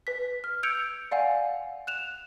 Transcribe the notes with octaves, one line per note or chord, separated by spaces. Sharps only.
B4 B6
F6
E6 G6 G#6 C#7 D7 F7
D5 F5 F#5 G#5
F#6 E7 F7